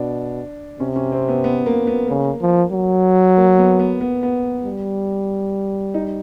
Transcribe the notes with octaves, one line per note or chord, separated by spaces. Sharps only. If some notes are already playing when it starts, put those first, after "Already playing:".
Already playing: B2 D4
C3 C#4
C#4
C4
B3
B3
A#3
B3
C#3 A#3
F3
F#3
A#3
B3
B3
B3
B3
G3
D#4